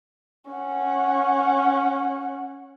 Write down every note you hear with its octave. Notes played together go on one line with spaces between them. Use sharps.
C#4 F#5